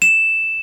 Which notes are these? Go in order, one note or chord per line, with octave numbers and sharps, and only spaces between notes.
E7